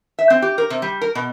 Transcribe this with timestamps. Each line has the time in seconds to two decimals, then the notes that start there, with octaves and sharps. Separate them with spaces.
0.19 E5
0.30 C4
0.42 G4
0.58 A#4
0.70 C3
0.82 G3
1.01 A#4
1.15 B2